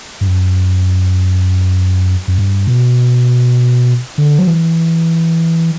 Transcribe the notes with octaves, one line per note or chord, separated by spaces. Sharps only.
G2
F#2
F#2
G2
B2
D3
F#3
E3